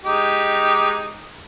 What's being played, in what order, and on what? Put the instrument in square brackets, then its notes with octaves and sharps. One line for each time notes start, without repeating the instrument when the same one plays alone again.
[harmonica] G#3 D#4 G4